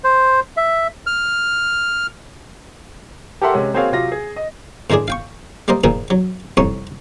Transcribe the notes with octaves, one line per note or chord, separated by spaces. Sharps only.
C5
E5
F6
G4 A4 A#4 E5 F#5 C6
C3 G#3 C#4
A#3 C4 F#4 G#4 C#5 F5
C3 F#3 F4 A#6
G#4
D#5
A2 D#3 G#3 D4 G#4
F5 G5 C#6
G3 A#3 A#4 C5 D#5
A#2 D#3 F3 D#4 G#4 A#4
F#3
C2 F2 D#4 C#5 F#5 C#6